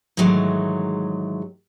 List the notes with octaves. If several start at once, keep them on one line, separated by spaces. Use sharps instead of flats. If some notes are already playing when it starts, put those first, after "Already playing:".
G#2 D#3 E3 F#3 G#3 A3